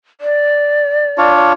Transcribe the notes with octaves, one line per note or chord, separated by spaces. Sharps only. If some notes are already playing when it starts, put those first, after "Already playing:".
D5
D4 F4 C#5